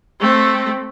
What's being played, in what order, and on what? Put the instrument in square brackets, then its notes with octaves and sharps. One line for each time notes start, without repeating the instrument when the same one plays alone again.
[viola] A3 C4